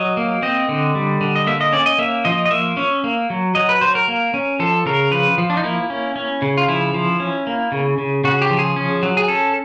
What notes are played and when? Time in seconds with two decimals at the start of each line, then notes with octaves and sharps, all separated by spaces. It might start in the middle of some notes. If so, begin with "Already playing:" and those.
Already playing: F#3 D#5
0.17 A#3
0.42 C4 D#5
0.69 D3
0.95 G3
1.21 D3
1.36 D#5
1.47 A#3 E5
1.61 D#5
1.73 C#4 D5
1.86 D#5
1.98 A#3 E5
2.25 F3 D#5
2.46 D#5
2.51 A#3 E5
2.77 C#4
3.04 A#3
3.30 F#3
3.55 F#3 D#5
3.69 B4
3.81 F#3 C5
3.95 A#4
4.08 A#3
4.34 C#4
4.60 F3 A4
4.86 C#3 A#4
5.11 F3 B4
5.38 F3
5.50 D4
5.57 D#4
5.64 A#3 E4
5.90 C#4
6.16 C#4
6.42 C#3
6.57 F4
6.68 F3 E4
6.94 F3
7.20 C#4
7.47 A#3
7.72 C#3
7.98 C#3
8.24 C#3 F#4
8.42 G4
8.51 F3
8.59 G#4
8.76 C#4
9.03 F#3
9.17 G#4
9.28 C#4 A4